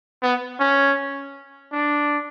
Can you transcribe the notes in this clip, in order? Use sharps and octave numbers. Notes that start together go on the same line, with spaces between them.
B3
C#4
D4